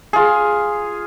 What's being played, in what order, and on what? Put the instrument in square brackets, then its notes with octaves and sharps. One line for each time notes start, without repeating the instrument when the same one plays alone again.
[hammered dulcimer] F4 G#4